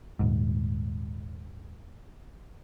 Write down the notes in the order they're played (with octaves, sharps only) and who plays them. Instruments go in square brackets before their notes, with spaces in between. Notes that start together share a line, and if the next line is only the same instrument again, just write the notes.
[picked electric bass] D#1 G#2